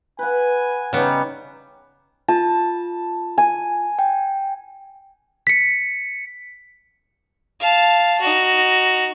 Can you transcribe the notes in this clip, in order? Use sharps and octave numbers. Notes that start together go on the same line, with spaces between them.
B4 F#5 G#5
C#3 G3 B3 D#4
F4 A5
G#5
G5
B6 C#7
F5 A5
D#4 F#4